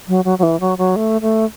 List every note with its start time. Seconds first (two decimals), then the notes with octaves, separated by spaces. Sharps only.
0.08 F#3
0.25 F#3
0.39 F#3
0.43 E3
0.60 F#3
0.78 F#3
0.96 A3
1.21 A3